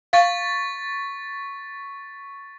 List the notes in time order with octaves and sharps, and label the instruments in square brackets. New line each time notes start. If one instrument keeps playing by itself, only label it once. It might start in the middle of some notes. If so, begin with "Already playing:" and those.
[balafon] F5 [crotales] C#6 A6 B6